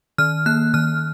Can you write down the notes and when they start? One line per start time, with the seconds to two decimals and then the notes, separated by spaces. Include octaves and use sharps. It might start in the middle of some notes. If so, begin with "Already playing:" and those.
0.18 D#3 F6
0.46 A#3 F#6
0.74 D#3 F6